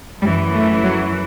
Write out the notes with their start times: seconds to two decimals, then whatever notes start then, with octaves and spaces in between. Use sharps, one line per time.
0.21 F#2 G3
0.26 E3
0.53 A3
0.83 F#3